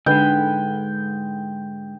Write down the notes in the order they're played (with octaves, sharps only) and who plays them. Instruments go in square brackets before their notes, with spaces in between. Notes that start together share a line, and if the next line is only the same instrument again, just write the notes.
[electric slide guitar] G#2 G#3 [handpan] D3 B4 [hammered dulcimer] G5